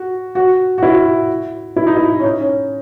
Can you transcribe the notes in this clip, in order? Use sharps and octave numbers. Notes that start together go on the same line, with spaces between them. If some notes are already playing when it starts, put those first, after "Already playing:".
Already playing: F#4
F#4
F#4
E4
E4
D#4
E4
C#4
D#4
C#4